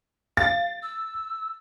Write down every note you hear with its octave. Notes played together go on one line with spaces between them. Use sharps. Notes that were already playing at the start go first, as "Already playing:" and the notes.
F5 A6
E6